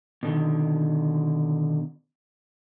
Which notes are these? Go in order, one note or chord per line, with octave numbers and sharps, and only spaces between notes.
B2 D3 D#3